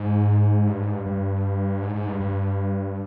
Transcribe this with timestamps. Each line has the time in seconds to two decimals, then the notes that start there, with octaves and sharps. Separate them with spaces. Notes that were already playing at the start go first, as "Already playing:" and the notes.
Already playing: G#2
0.67 G2
0.80 G#2
0.93 G2
1.06 G2
1.82 G#2
1.95 G#2
2.08 G2
2.20 G2